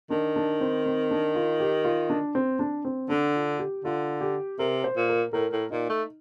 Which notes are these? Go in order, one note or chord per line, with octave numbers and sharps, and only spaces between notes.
D#3 D4
D4
C4
C4
D4
F4
G4
F4
D4
C4
D4
C4
D3 D4
F4
G4
D3 F4
G4
C3 A#4
C5
A#2
A#4
A2 A#4
A2
A#2 D#4
A3